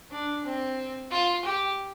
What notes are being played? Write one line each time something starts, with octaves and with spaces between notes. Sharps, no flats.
D4
C4
F4
G4